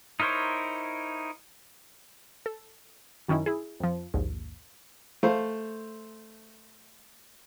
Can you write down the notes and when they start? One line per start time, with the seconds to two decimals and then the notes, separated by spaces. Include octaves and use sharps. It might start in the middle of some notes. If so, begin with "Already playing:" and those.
0.20 D#4 E4 A#4 C5 C#5
2.46 A4
3.28 F#2 D#3 C#4 D#4 E4
3.46 E4 G#4
3.80 F2 F3
4.14 A#1 D#2 G#2
5.23 A3 C5 F5